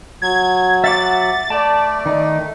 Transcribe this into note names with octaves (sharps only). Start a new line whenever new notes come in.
F#3 G#6
E5 F#5 D6 A6
A3 D5 A5
D#3 D#4